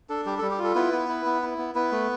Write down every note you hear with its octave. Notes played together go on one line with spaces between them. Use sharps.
D4 A4
G3 G4
A4
G3
G4
F4 A4
B3 E4 B4
B3
E4
B3
E4
B3
B3 E4 B4
A3